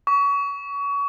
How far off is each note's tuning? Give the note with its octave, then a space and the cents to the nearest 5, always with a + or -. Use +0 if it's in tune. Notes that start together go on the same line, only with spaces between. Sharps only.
C#6 +30